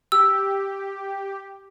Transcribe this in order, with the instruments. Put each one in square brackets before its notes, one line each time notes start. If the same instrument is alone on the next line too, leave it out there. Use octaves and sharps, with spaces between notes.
[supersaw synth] G4 [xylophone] E6